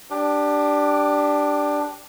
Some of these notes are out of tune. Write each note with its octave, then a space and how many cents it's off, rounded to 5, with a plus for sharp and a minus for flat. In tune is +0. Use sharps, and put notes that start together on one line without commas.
D4 +0 G4 +0 D6 +25